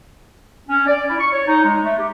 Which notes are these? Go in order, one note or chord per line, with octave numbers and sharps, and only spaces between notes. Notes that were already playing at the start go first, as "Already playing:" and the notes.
C#4
D5
E4
C#6
C#5
D#4
G#3
A3
G4